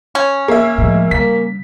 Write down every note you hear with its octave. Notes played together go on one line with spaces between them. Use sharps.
C#4
A#3 E5
A2 F3 G#3
C#3 G3 A#3 B6